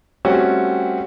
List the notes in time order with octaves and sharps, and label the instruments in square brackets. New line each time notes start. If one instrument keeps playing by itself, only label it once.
[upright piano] G3 A3 C4 C#4 F#4